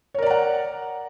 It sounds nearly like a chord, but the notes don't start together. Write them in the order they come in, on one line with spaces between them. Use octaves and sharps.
C#5 A#4 D5 A#5 F#5